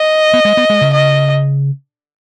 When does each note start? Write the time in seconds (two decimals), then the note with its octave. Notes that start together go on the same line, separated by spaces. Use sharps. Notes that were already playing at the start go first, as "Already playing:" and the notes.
Already playing: D#5
0.33 B3
0.45 G#3
0.57 B3
0.70 G#3
0.81 C#3
0.93 D#5